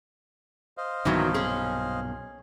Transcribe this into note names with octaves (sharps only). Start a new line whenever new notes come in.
C5 D#5 F5
B1 G2 A#2 D#3 E3 F#3
C#4 G#4